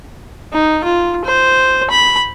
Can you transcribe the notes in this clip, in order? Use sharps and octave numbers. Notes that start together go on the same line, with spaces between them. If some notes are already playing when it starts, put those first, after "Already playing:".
D#4
F4
C5
B5